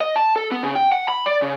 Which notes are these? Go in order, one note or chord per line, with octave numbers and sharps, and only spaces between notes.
D#5
A5
A4
B3
C#3
G5
F#5
B5
D5
C#3